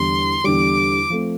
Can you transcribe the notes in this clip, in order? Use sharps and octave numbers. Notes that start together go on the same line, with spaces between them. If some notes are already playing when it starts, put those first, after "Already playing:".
Already playing: E2 D3 G3 C6
E2 D3 G3 D6
F3 A3 C4